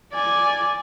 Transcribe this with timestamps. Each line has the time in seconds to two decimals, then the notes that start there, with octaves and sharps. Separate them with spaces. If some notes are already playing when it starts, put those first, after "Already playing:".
0.13 D5 G#5